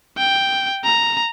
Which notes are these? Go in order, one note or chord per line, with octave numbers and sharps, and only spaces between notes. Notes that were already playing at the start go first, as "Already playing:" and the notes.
G5
A#5